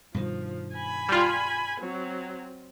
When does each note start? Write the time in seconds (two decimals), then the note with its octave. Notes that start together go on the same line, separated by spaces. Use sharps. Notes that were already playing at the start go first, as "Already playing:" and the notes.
0.14 G2 B2 D#3 F3
0.74 G#5 B5
1.09 G3 F4
1.80 F#3 C4